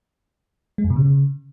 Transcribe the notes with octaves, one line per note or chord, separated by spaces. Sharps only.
G#3
F2
B2
C#3